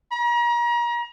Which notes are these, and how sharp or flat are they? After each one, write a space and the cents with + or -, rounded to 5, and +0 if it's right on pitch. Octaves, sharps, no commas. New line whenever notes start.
A#5 +35